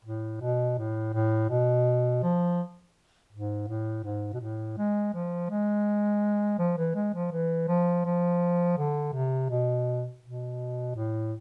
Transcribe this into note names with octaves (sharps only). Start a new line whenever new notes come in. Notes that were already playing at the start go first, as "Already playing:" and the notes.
A2
B2
A2
A2
B2
F3
G#2
A2
G#2
B2
A2
G#3
F3
G#3
F3
E3
G#3
F3
E3
F3
F3
D3
C3
B2
B2
A2